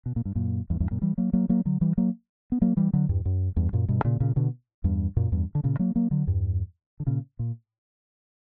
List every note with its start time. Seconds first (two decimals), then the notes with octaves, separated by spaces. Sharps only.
0.06 B2
0.16 A#2
0.25 G2
0.35 F#2 A#2
0.70 E2 G2
0.80 E2 G2
0.91 F#2 A#2
1.01 E3 G3
1.18 F#3 A#3
1.33 F#3 A#3
1.49 F#3 A#3
1.65 D3 F#3
1.81 E3 G3
1.98 F#3 A#3
2.52 B3
2.62 F#3 A#3
2.77 E3 G3
2.93 D3 F#3
3.09 E2 G2
3.25 F#2
3.56 E2 G2
3.73 F#2 A#2
3.88 G2 B2
4.05 A#2 C#3
4.20 A#2 C#3
4.36 B2 D3
4.84 E2 G2
5.17 F#2 A#2
5.32 E2 G2
5.55 D3
5.64 A#2 C#3
5.79 F#3 A#3
5.96 F#3 A#3
6.11 D3 F#3
6.27 E2 G2
7.00 D3
7.07 A#2 C#3
7.39 A#2